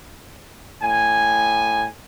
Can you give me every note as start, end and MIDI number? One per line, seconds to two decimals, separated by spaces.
0.83 1.86 45
0.83 1.86 80